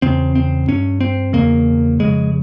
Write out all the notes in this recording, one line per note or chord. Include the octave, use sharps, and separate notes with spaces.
E2 C#3 C4
C4
G2 C#4
C4
E2 C#3 A#3
F2 C#3 G#3